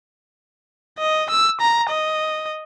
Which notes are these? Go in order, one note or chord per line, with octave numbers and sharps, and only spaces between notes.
D#5
E6
A#5
D#5